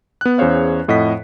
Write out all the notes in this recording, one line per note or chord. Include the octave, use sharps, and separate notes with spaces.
B3 F#6
E2 C#4 G#4 C5 C#5 F5
F2 A2 D#5 F#5 B6